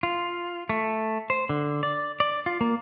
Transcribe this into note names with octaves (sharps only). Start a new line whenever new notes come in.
F4
A3
C5
D3
D5
D5
F4
A#3